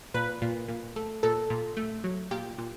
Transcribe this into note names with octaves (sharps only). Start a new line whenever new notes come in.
A#2 B4
A#2
A#2
A3
A#2 A4
A#2
A3
F#3
A#2 G4
A#2